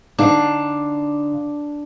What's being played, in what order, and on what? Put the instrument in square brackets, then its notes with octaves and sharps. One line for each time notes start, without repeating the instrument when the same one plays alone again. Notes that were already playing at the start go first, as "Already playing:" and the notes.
[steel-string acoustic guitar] D3 D#4 F5 [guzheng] D4